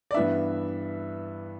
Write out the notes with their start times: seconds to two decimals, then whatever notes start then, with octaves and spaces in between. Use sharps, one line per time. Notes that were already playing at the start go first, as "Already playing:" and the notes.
0.11 D5
0.14 G2 E3 B3 D4 E5